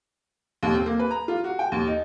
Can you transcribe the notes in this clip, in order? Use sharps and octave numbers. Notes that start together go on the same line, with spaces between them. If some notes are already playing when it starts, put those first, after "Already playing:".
D#2
C4
A#3
B4
A#5
F4
F#4
G5
D#2
D#4